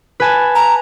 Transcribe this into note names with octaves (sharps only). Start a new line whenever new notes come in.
B4 G#5 A5
A#5